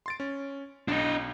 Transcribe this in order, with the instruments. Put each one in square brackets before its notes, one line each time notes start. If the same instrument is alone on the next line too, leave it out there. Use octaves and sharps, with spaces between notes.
[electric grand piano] C6 A6 D7
C#4
[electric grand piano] B1 [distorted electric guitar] D4 D#5